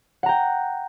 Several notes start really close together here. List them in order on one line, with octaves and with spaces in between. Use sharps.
F#5 A#5 G5